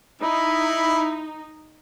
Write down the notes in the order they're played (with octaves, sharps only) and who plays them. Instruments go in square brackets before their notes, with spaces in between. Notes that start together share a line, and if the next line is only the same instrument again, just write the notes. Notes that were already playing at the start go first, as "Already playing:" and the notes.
[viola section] D#4 [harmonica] E4 B5